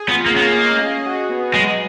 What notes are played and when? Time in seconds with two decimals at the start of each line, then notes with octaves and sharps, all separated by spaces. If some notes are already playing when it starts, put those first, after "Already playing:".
Already playing: G#4
0.09 B3 F4
0.26 A#3
0.33 B3 C#4
0.41 A#3
0.57 D#5
0.82 G#4
1.06 F#4
1.30 B3
1.54 F#3 G#3